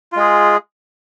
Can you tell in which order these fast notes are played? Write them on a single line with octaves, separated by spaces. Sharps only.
F4 G#3 G#4